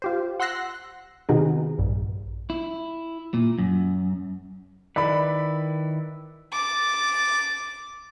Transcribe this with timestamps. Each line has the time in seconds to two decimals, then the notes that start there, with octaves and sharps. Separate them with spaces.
0.02 F4 G4 C5
0.40 F#5 C6 E6 F#6 A#6 C7
1.29 C3 D#3 B3 D#4 F#4 G#4
1.79 A#1 G2
2.50 E4
3.34 A#2
3.59 F#2
4.96 D#3 E4 B4 D5 B5
6.52 D6 A6